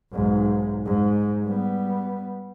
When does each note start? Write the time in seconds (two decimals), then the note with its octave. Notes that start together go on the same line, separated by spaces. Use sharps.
0.12 B1 G#2
0.85 G#2
1.44 G3 B3